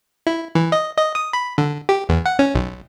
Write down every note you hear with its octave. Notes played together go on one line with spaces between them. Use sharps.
E4
E3
D#5
D#5
D#6
B5
D3
G4
E2
F#5
C#4
B1